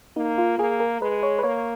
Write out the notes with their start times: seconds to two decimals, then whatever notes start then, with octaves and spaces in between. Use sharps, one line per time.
0.16 A#3 D#4
0.38 F4
0.58 A#3 G#4
0.80 A#4
1.01 G#3 B4
1.23 C#5
1.39 B4
1.43 A#3 C#5